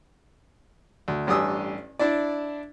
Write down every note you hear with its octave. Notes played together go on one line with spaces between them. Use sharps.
D2
A1 G2 G4 G#5 D#6 E6
D4 E4 D5